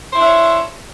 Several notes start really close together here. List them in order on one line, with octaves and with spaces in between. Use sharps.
C5 E4 D4 E5 C#5